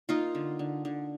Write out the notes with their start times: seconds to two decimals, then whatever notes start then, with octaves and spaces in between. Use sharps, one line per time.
0.09 A#3 D#4 F4
0.35 D3
0.59 D3
0.85 D3